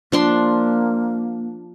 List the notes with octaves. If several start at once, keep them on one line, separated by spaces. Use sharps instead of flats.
F3 A#3 D4 C6